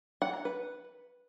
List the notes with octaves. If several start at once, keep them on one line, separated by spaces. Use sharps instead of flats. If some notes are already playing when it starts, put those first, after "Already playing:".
F#5
A#5
B4